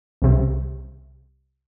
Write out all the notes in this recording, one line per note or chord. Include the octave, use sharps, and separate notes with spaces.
C2 C3